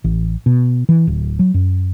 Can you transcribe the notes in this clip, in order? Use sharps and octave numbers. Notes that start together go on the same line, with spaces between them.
A1
B2
E3
D1
F#3
F#2